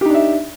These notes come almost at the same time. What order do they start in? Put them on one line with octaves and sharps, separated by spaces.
G4 D#4 D4 E5